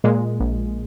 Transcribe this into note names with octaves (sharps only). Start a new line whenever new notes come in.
A#2 G#3
A#1